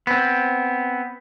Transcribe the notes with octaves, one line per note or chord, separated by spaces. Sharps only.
B3 C4